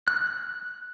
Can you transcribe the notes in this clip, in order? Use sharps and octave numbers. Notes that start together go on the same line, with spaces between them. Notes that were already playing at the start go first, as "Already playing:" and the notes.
F#6